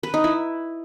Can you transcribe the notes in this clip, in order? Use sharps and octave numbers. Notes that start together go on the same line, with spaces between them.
B4
D#4
E4